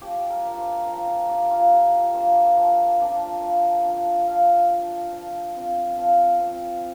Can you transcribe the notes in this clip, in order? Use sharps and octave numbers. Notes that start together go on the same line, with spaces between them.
F3 G4
A#4
A#3 D4 F4
C5
F3 A#4
A#4
A#3 D4 F4 G4
F4
F3 G4
A#3 D4 F4 C5
F3
A#3 D4 F4
F3
D4 F4
F3 F5
D4 F4
F3
C4 F4
F3 F5
C4 F4